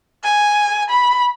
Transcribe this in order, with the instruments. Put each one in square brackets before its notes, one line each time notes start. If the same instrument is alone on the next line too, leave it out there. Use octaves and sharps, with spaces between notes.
[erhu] G#5
B5